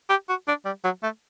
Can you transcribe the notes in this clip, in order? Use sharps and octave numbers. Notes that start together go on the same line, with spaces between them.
G4
F#4
D4
G3
F#3
A3